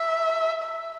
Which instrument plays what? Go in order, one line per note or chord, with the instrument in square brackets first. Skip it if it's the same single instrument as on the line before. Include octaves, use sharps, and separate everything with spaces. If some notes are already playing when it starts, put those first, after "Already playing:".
Already playing: [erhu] E5
E5